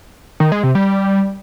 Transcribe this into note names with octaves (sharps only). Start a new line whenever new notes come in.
D#3
G#3
C3
G3